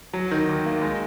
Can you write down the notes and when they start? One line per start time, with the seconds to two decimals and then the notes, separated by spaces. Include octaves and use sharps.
0.13 F#3
0.31 D#3
0.49 D#2
0.66 A#3
0.82 G#3